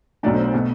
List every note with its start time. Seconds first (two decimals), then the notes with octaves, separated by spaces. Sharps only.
0.23 B1 B2 F#3 A3 D4 D5
0.34 C5
0.44 C5
0.54 B2 A3